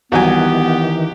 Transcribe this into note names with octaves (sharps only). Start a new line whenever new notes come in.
C2 D#3 E3 F#3 B3 G4 G#5